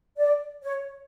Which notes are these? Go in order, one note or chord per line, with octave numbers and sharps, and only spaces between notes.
D5
C#5